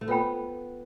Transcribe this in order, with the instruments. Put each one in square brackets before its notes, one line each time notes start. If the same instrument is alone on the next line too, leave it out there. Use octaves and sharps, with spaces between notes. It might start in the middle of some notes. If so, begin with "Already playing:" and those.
[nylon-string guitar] A3
[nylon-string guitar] B3 [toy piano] F4 A4 C5 G5 B5